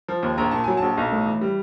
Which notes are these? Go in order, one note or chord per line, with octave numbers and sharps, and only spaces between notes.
F3
D#2
A#1 A#5
A#2 A5
F#3 G#5
A#1 A5
B1
A2
E3
G3